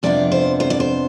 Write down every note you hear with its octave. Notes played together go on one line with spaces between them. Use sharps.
F2 C3 F3 B3 D4 D5
C5
C5
D5
C5